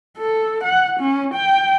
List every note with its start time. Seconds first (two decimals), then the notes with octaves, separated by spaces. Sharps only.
0.18 A4
0.64 F#5
1.00 C#4
1.34 G5